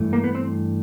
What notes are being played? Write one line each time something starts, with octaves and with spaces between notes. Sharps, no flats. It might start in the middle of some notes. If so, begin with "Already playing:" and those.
Already playing: G2 E3 A3
A#3
B3
C4